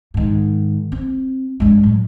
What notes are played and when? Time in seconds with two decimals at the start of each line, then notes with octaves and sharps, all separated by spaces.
0.14 G#2 D#3
0.92 C4
1.60 G2 G#3
1.83 A2 F#3